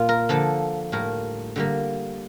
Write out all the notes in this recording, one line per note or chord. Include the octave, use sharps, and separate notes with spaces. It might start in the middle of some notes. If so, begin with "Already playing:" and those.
Already playing: A#2 A#3 F4
A#4
D3 F3 A#3 A4
A2 G3 A#3 A#4
D3 G3 A#3